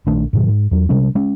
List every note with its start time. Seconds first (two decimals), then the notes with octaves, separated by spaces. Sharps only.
0.07 A#1 D#3 A3 D4
0.33 G#2 B2 D#3 F#3
0.48 G#2
0.71 E2 F#3
0.89 C3 G3 G#3 C#4
1.15 G#3 C#4